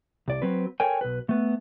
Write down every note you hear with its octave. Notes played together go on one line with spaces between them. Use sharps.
C2 D5
F#3 C4 B4
A4 A#4 C#5 G5 G#5
B1 B4
A3 B3